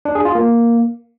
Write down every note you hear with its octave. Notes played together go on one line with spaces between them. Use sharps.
D4
G#4
F4
A#3